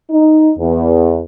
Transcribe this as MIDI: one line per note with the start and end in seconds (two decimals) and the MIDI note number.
0.10 0.51 63
0.57 1.21 40